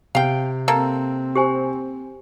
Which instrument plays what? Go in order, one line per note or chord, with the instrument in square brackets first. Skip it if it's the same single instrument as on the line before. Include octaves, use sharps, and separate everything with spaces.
[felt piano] C3 [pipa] F5 G5
[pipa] A#3 A4 [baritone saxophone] C4
[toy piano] G4 C5 G#5